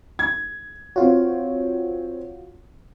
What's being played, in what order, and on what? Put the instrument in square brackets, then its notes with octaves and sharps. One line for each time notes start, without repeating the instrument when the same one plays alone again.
[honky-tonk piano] G#6
[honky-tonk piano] C4 C#5 [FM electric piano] F4 F#4